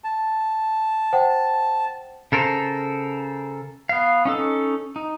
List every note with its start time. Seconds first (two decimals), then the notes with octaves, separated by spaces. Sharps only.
0.04 A5
1.13 C5 F#5 G5
2.32 C#3 A4 A#4 C5
3.89 B3 F5
4.25 C#4 D#4 A4
4.96 D#4